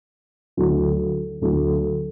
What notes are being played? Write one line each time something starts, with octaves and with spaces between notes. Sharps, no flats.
D2 D3 F#3
D2 D3 F#3